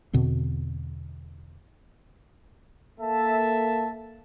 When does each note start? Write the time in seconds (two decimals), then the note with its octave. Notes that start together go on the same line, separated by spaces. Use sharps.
0.13 E2 B2 D3 C4
3.00 A#3 A4 E5 A5